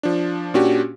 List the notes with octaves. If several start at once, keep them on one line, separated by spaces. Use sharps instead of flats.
F3 D4
A#2 C#4 D4 F#4 G4